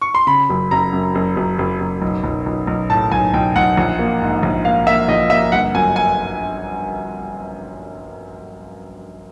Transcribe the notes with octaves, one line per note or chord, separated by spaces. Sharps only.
C#6
C6
C#3 B5
F#1
F#1 A#5
F#2
F#1
F#1
F#1
F#1
B1
B1
B1
B1
A2 A5
B1 G#5
B1 G5
B1 F#5
A#1
A#3
G#2
A#1
A#3 F5
A#3 E5
A#1 D#5
A#3 E5
G1 F#5
F#2 G#5
G#5